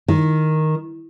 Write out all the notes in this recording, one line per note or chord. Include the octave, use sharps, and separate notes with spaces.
D#3